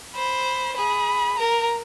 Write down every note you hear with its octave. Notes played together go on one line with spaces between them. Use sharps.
C5 B5
G#4 B5
A#4 A#5